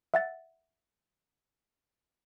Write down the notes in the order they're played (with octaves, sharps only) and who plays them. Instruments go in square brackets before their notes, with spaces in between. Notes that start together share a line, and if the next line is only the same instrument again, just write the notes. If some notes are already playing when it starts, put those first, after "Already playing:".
[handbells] E5 F#5 A6